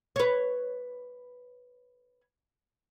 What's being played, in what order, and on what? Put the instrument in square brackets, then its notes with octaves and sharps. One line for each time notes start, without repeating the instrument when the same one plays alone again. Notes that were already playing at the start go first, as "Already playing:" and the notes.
[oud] B4 C#5